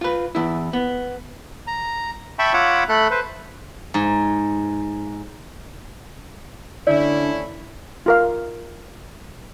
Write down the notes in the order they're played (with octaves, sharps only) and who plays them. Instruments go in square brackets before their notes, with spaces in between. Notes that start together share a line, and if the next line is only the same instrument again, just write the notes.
[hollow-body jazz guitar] F4 B4
E2 E4
B3
[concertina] A#5
E5 G5 A5 B5 C#6
F4 C#5 F#5 B5 D6 E6
A3 A4 B5 F#6
B4 C5
[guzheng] G#2
[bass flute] D3 [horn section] A3 C#4 E4 [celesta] D5
[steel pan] F4 A#4 F5